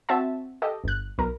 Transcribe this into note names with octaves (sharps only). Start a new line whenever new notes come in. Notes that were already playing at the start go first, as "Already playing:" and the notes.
C4 F#4 E5 A5
G4 A4 D#5
G1 F#6
B1 A#4